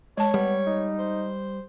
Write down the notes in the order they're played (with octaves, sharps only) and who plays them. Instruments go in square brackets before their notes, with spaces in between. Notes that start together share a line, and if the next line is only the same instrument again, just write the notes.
[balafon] G#3 A5 [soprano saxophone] C#5
[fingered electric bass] G3 [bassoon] B3
[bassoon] D#4
[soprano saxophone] C5